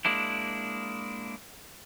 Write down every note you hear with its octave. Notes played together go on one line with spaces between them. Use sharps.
G#3 A#3 D4 E4